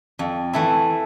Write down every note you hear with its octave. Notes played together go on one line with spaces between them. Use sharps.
F2
E3 A3 E4